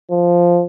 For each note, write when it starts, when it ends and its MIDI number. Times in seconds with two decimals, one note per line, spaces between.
0.11 0.64 53